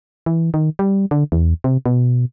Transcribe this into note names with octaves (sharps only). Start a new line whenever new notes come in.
E3
D#3
G3
D3
E2
C3
B2